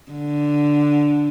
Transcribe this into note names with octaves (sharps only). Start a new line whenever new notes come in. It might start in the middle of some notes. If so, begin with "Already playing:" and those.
D3